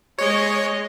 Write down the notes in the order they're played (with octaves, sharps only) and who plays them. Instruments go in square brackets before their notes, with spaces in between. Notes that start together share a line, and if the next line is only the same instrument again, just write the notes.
[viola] G#3 D#5 [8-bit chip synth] C#5